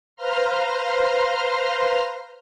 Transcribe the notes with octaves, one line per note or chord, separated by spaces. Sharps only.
B4 C5 F5 A#5 C6 F6